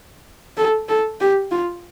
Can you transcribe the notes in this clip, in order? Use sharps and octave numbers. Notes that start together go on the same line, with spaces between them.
A4
A4
G4
F4